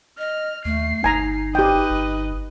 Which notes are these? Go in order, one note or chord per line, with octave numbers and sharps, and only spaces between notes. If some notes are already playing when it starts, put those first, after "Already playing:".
D#5 F6
D#2 A3 C7
G1 D#4 G#5 A#5
G4 B4 D#5 G5
G1